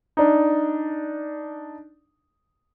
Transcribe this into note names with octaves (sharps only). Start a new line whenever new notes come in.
D4 D#4